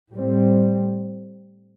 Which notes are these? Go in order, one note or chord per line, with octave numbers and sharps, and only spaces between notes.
A2 G3 C4